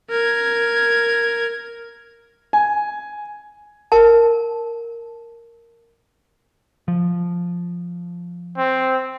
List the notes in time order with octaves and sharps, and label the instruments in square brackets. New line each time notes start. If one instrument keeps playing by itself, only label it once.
[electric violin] A#4 G#6
[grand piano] G#5
[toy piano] A#4 A5
[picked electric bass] F3
[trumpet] C4